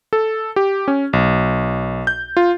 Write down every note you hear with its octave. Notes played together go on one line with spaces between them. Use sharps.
A4
G4
C#4
B1
G6
F4